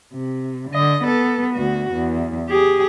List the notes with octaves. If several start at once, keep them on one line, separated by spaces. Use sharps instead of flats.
C3
D3 D#5
B3 A4
D2 F#4
E2
G4 G#4